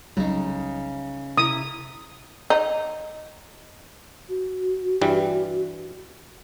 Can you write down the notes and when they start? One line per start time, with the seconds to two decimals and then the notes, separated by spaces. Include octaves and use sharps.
0.17 C2 C#3 F#3 G3 D#4
1.38 C3 E4 A#4 E5 D#6
2.50 D#4
4.29 F#4
5.01 G2 E3 G3